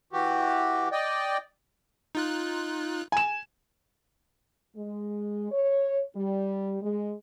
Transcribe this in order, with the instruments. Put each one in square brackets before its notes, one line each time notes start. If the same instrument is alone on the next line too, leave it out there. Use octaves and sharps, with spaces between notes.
[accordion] E3 F#4 G4
D5 D#5 G5
[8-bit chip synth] D#4 F4 F#6
[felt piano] G#5 E7
[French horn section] G#3
C#5
G3
G#3